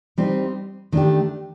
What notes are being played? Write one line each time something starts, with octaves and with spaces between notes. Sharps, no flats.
G3 C4 D#4
D#3 A3 D4 G4